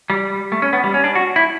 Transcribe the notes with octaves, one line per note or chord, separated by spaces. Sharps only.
G3
A3
C#4
B3
G3
C#4
D4
F#4
E4